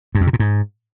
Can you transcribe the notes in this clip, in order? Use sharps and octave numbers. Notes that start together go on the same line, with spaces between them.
G2
F2
C3
A#2
G#2